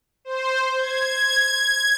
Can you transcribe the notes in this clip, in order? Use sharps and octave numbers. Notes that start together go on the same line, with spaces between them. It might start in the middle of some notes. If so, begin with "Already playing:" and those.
C5
G#6